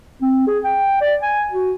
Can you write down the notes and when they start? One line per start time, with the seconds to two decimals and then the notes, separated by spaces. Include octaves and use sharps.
0.21 C4
0.47 G#4
0.64 G5
1.01 D5
1.22 G#5
1.52 F#4